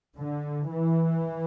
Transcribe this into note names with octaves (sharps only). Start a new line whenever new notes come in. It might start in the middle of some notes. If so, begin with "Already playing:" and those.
D3
E3